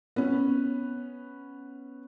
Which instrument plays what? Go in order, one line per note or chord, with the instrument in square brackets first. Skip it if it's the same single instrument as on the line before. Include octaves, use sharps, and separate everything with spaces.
[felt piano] B3 C#4